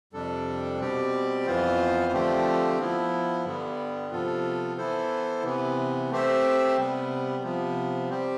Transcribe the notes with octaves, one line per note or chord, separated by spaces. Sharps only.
F2 C3 G3 D4 A4
B2 G3 C4 G4 D5
F2 E3 B3 F4 C5
D3 F3 A3 C4 G4
F3 B3 E4
G2 D3 G3 B3
C3 F3 B3 F4 A4
E3 B3 E4 A4 C5
C3 E3 B3
A3 C4 G4 C5 E5
C3 G3 B3
C3 F3 B3
G3 C4 G4